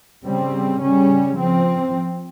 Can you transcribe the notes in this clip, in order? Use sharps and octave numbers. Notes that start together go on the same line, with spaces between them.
C#3 G3 C4
C#3 G3 C#4
F3 C4